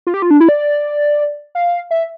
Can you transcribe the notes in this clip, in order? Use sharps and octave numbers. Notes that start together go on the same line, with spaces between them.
F4
G4
F4
D4
E4
D5
F5
E5